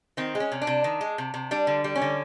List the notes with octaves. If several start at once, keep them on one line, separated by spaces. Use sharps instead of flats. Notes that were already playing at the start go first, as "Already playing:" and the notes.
D#3 C4
G#3
C#4
C3
D4
C3
D#3
G#3
C3
C3
G3 D4
D3
G3
C#4
D3